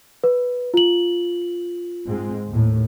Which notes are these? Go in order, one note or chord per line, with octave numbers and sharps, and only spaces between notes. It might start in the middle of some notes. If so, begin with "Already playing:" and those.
B4
F4 F#7
G#2 G#3 C4
D#2 A2